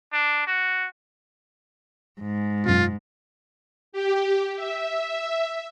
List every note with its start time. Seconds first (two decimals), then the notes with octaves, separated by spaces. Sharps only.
0.13 D4
0.47 F#4
2.21 G#2
2.65 F#2 B2 F4
3.92 G4
4.56 E5